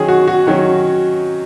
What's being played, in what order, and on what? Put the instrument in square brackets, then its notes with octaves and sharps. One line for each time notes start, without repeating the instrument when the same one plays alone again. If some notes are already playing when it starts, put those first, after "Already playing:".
Already playing: [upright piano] D#3 F#3 C#4 G#4
F#4
F#4
D#3 F#3 C#4